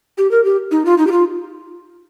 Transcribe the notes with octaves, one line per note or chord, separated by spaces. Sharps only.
G4
A#4
G4
D#4
F4
D#4
G4
F4